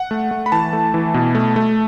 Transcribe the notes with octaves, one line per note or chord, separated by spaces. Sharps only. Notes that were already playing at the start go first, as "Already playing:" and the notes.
Already playing: F#5
A3
A3
B5
E3 A5
A3
E3
B2
A3
A3